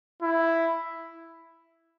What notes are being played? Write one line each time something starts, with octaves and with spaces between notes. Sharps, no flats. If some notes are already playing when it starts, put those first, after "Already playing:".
E4